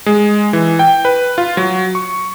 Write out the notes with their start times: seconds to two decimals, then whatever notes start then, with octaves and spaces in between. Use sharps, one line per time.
0.06 G#3
0.53 E3
0.79 G5
1.05 B4
1.38 F4
1.57 F#3
1.95 C#6